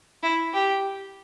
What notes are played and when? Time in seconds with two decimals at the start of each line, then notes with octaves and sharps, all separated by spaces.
0.23 E4
0.53 G4